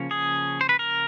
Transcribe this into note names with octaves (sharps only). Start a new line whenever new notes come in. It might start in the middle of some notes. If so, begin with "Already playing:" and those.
Already playing: C#3 F3 A#3 C#4
G#4
C5
B4
A#4